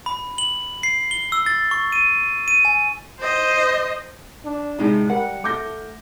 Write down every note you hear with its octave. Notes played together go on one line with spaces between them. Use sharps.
B5
F#7
C7
G7
E6
A6
C#6
D#7
D#7
G#5
C5 D#5
D4
A2 C3 G3 G#3 D#4
G3 A#4 F#5
A3 D6 G6 A#6